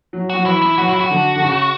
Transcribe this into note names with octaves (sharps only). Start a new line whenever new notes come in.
F#3
F#3 F#4
E3 E4
E4
F#3 F#4
E4
F#4
D3
D3
C#3